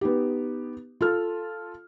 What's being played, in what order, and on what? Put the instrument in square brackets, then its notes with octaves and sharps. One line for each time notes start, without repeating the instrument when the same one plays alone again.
[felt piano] B3 D#4 G4
F4 A4 F6